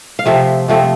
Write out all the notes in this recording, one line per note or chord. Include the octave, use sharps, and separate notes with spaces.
F5
C3 F3 A3 C4 E5
C3 F3 A3 C4